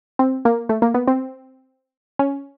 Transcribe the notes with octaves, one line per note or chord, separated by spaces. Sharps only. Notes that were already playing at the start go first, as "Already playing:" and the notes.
C4
A#3
A3
A#3
B3
C4
C#4